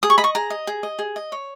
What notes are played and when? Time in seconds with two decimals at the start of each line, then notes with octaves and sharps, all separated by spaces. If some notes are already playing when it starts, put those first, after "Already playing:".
0.03 G#4 D#6
0.10 C#6
0.18 D#5 B5
0.24 C#6
0.35 G#4 A#5
0.50 D#5
0.67 G#4
0.83 D#5
0.99 G#4
1.16 D#5
1.32 C#5